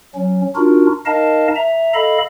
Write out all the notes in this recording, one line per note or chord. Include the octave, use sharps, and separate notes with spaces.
F#3 C#4
D4 D#4 F4 F#4 A#4
D#4 A#4 D#5 F5 A5
E5 A#5
A4 D#5 F5 B5